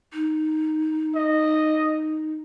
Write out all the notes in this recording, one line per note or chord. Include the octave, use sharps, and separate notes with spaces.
D#4
D#5